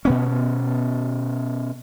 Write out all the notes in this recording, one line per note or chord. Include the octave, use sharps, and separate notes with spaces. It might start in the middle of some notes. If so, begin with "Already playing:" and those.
B2 B3 C#4